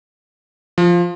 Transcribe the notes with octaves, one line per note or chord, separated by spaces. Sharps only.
F3